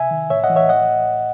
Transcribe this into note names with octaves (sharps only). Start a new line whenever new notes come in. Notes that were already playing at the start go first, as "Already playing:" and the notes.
Already playing: C3 E5 G#5
D#3
A2 C#5 E5
D#5 F#5
E3
C#5 E5
A2 D#5 F#5